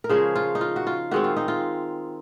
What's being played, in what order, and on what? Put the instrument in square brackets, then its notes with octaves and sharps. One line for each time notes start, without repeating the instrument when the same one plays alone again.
[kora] A#4
C#3 F3 G#3 C#4 G#4 C5
F4
D#4
F4
F#4
F4
D#3 G#3 C4 F#4
F4
D#4
F4